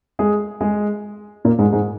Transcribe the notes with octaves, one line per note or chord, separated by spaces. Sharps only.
G#3 G#4
G#3 G#4
A#2 A#3
G#2 G#3
G#2 G#3